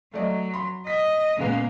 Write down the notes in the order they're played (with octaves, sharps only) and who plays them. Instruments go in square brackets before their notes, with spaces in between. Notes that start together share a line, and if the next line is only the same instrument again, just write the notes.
[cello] F#3 [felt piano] A3 D5 D#5
[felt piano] B5 C6
[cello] D#5 [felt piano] B6
[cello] A#2 A#3 [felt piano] C#3 G#3 B3